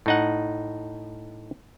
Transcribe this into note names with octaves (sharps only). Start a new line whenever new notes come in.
A2 D#4 F#5